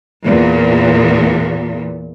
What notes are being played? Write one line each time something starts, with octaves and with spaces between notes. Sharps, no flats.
E2 A#2